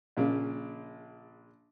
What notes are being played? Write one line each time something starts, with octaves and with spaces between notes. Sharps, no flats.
A#1 A#2 C#3